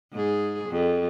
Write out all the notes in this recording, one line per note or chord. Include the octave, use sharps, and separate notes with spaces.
G#2 G#4
F2